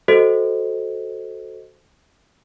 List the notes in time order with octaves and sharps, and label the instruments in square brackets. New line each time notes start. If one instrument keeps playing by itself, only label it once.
[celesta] F#4 A4 C5 D#5